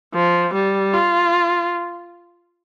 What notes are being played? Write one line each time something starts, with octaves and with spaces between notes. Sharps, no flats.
F3
G3
F4